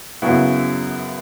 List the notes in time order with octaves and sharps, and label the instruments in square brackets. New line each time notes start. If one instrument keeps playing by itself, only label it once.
[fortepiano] F#2 C#3 F#3 B3 E4